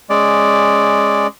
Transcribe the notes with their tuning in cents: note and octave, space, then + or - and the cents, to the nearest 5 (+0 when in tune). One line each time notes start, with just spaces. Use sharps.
G#3 +0 C#4 -10 D5 +0